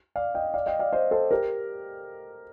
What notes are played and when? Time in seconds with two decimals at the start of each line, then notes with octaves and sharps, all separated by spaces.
0.16 D5 F5
0.35 D#5 G5
0.54 D5 F5
0.66 D#5 G5
0.79 D5 F5
0.93 C5 D#5
1.11 A4 C5
1.31 G4 A#4